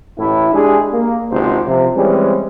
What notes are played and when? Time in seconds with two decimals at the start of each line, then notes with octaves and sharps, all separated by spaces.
0.19 A1 A2 E4
0.54 G#3 D4 G4 G#4
0.93 A#3
1.31 G#1 C#2 C3 C5
1.68 C3 F3
1.96 E3 G3 G#3 C4 C#4